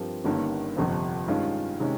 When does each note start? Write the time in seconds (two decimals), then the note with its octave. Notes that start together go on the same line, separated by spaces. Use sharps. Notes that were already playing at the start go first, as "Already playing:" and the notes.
Already playing: G2 F3 C4 G4 A#4
0.24 G1 G2 D#3 A#3 C#4
0.76 G1 F2 C3 F3
1.28 G2 D#3 G#3 C#4 F4
1.80 C3 D#3 G#3 C#4